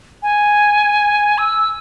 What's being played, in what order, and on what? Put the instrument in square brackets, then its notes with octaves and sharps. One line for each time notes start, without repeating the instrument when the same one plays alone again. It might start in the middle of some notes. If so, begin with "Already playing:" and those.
[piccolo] G#5
E6